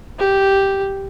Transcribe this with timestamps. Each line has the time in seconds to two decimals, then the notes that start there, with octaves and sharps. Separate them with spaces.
0.19 G4